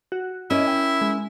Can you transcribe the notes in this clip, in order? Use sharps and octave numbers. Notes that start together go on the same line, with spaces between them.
F#4
C#4 E4 A#4 D#5
G5
G#3